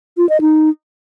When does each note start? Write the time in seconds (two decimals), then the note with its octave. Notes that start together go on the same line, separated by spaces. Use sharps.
0.17 F4
0.29 D#5
0.41 D#4